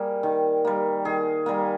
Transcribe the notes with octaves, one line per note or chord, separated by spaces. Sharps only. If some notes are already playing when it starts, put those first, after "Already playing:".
Already playing: G3 A#3 G#4
D#3
G3 A#3
D#3 G#4
G3 A#3